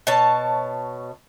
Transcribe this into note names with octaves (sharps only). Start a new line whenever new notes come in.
B2 C#5 A5